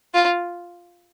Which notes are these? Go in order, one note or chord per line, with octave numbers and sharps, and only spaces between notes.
F4